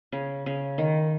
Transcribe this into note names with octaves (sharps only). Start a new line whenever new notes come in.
C#3
C#3
D#3